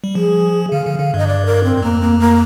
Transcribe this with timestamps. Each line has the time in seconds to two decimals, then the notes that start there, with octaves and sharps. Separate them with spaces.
0.04 G3
0.15 F3 G#4
0.72 D3 F5
0.86 D3
0.99 D3
1.14 G2 D#5
1.27 D5
1.46 A#4
1.64 C4
1.77 G2
1.82 F2 A#3
2.01 A#3
2.20 A#3